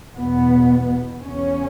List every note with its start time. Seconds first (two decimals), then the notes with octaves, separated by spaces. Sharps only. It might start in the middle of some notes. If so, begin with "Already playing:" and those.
0.16 E2 B2 B3
1.23 E2 C#3 C#4